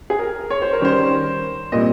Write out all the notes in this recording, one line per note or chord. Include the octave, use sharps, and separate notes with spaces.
G#4
A#4
C#5
C5
A#4
D#3 G3 C#4 C5
A#2 G3 C4 D#5